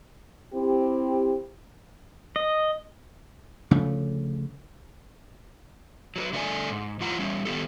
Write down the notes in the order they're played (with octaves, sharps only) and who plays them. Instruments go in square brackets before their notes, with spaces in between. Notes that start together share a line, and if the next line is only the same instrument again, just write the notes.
[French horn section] C4 E4 G4
[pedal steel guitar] D#5
[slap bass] D2 C#3 F3 A3
[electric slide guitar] F#3 A#4 B4
D3 A3 D5 G#5
G#2
E2 E3 F4 F#5 A#5
E2 G3 C#4
D#3 B3 G4 A4